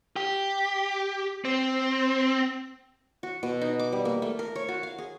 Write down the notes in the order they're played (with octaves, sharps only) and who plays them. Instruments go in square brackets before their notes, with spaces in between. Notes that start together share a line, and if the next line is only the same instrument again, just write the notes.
[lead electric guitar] G4
C4
[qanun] F#4
B2
D#4
D6
G3
A#3
A3
A#4
C#5
F#4
F5
G#4